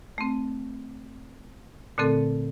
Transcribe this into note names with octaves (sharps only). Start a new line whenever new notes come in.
A3 C4
A#2 D3 A3 C4 A4